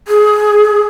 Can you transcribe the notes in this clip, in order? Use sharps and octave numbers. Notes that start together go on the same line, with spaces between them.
G#4